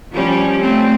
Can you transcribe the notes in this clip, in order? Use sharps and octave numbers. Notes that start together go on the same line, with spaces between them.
F3 G3 C#4
A3 C4